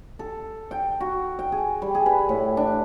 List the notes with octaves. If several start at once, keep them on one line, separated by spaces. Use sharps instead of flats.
A4
G5
F#4
G5
G#4
G3
G#4
B4
A2
D4